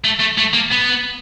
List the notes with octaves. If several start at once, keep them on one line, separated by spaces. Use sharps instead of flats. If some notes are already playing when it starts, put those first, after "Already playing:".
A3
A3
A3
A#3
B3